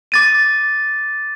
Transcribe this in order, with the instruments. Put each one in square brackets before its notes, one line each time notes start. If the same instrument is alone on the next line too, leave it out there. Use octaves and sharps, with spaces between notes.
[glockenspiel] D6 A6 D#7